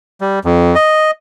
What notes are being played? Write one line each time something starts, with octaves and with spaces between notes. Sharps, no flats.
G3
F2
D#5